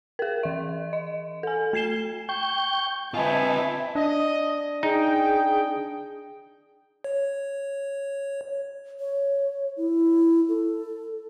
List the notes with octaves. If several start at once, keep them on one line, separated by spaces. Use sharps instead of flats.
G#4 A#4
E3 E5
D#5
A4 G#5
A3 G#6 C7 E7 G7
G5 C#6 G6
C4 F4 B4 D#5 E5 G#5 A5
D4 D#5
D#4 G#4 G5
C#5
C#5
E4
A4